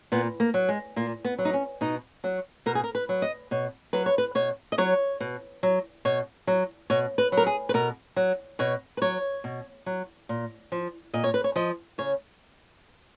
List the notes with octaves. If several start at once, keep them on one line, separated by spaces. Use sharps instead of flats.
A#2 B3
A#3
F#3
G#3
A#2 A#3
B3
F#3
D#4
C#4
B2 D#4
F#3 F#4
B2 A#4
G#4
A#4
B4
F#3
D#5
B2 C#5
F#3 B4
C#5
B4
B2 C#5
D#5
F#3 C#5
B2
F#3
B2 C#5
F#3
B2 C#5
B4
F#3
A#4
G#4
B4
B2 A#4
F#3
B2 C#5
B4
F#3 C#5
B2
F#3
A#2
F3
A#2 D#5
C#5
B4
C#5
F3 D#5
C#3 C#5